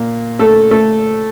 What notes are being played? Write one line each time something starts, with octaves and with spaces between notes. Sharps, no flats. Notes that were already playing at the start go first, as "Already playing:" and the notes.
Already playing: A#2 A#3
A3 A4
A3 A4